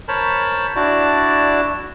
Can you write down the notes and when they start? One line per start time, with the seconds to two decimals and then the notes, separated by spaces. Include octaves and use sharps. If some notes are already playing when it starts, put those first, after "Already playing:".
0.08 A#4 C5 C#5 A5 B5
0.76 D4 E4 F#4 D5 A5